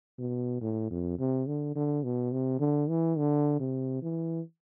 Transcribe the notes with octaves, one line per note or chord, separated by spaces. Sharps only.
B2
A2
F2
C3
D3
D3
B2
C3
D3
E3
D3
C3
E3